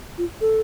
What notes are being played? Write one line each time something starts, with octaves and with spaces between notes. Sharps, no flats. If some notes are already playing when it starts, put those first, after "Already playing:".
F4
A4